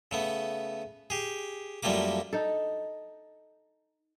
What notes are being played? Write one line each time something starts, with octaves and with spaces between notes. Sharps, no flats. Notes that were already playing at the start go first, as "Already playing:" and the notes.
C#3 A3 B3
G4 G#4
F#2 F3 G3 A3 A#3 D6
D#4 A4